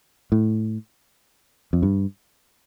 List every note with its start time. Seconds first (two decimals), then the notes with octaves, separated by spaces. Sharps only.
0.32 A2
1.73 F2
1.83 G2